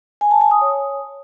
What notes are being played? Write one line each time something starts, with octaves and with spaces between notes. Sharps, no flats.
G#5
A5
G#5
D#6
C#5